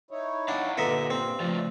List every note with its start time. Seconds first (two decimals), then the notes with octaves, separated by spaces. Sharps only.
0.11 D#4 E4 C#5
0.48 D4 F5 F#5 G#5
0.78 G2 A#2 D3 B4 D#5 E5 A#5
1.10 C4
1.40 C#3 F3 A3 F4 D5